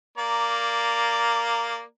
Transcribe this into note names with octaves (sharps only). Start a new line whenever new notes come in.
A#3 D5 A#5